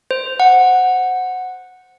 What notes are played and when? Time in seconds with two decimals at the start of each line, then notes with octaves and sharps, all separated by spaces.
0.11 C5
0.40 F#5